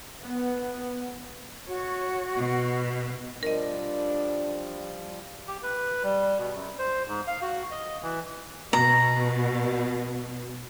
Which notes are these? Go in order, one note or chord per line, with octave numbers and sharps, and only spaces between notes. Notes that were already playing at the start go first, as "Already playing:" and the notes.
B3
F#4 C#5
B2
F3 G3 D4 A#4 D#5
G4
B4
G3
B2
F#2
C5
G#2
F5
F#4
D#5
E3
B2 A#5